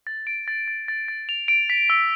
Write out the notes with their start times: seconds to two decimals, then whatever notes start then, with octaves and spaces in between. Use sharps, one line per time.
0.07 A6
0.27 D7
0.48 A6
0.68 A6
0.88 A6
1.08 A6
1.29 F7
1.48 D7
1.70 B6
1.90 E6